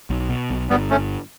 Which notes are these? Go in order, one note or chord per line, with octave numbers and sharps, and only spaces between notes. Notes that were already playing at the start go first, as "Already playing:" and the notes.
B1
B2
B1
G1 G3 B3
A3 C#4